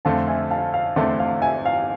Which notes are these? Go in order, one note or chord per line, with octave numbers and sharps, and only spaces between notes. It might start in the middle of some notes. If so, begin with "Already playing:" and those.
F2 D3 A3 C4 F5 A5
E5 G#5
F5 A5
F5
E2 D3 A3 C4 E5
F5
E5 G#5
F5